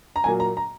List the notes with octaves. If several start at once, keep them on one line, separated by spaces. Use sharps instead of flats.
A#5
A#2 F#3 A#3 G#5
A#5
A#5